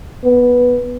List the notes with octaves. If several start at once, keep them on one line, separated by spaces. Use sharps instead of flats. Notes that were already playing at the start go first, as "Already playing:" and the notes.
B3